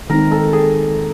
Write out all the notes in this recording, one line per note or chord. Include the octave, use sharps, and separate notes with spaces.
D#3 G#3 C4 D#4 A#4
A4
G#4